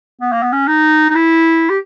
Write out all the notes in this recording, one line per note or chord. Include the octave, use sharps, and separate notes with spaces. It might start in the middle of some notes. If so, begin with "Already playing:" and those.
B3
A#3
B3
C#4
D#4
D#4
E4
G4